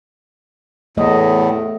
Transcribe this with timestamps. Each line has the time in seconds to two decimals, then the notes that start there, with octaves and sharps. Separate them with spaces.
0.97 E2 A2 A3 D#5